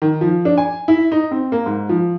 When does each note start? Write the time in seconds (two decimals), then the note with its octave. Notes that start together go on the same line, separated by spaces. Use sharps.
0.02 D#3
0.21 F3
0.45 D4
0.58 G#5
0.88 E4
1.12 D#4
1.31 C4
1.52 A#3
1.66 G#2
1.89 F3